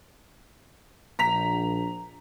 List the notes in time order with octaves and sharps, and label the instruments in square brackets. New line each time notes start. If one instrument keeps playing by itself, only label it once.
[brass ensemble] A#1 [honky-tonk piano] A#5 B6 F7